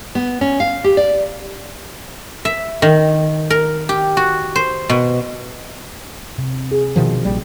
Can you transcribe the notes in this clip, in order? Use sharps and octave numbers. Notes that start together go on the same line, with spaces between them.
B3
C#4
F5
G4
D5
E5
D#3
A#4
G4
F#4
C5
B2
C3
G#4
B2 D#3 F3
A#1 G3